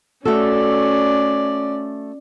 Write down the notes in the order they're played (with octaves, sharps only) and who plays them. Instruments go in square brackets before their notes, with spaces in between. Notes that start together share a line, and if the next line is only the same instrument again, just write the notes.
[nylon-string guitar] A3 F#4 A4 [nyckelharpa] C#4 D5